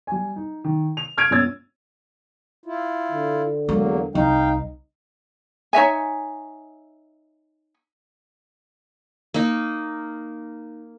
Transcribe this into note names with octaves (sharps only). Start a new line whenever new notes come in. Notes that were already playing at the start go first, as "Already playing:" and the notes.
G3 G#5
D#4
D#3
F7
F6 G#6 D7 D#7 F7
G1 A#2 C#4 E6 G#6 A6
E4 F4
D3
E2 F#3 G#3 A#3
C2 D#4 F5 G5
D#4 C#5 E5 G#5
A#3 D#4